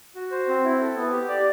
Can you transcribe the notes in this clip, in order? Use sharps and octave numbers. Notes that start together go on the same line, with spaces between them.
F#4
C5
C4
E4
A4
B3
G4
D5